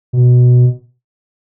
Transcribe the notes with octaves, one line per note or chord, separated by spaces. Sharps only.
B2